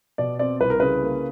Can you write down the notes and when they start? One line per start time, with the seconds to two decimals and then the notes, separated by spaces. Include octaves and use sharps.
0.18 B2 D5
0.39 C4 D5
0.61 C2 B4
0.70 A#4
0.80 C#3 B4
1.03 A#3